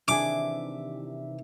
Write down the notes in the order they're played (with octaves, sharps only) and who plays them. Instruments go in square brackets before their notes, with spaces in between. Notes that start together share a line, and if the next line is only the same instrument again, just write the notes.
[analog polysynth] C3 D#3 E3 [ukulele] D4 G#4 [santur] E5 [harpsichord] D6